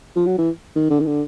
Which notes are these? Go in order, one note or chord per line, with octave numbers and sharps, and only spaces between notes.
F3
F#3
E3
D#3
D3
D#3
D3